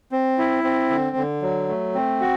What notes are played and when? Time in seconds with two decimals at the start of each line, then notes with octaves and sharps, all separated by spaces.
0.12 C4
0.38 E4
0.64 C4
0.90 D3
1.17 D3
1.42 F#3
1.68 A3
1.95 C4
2.21 F#4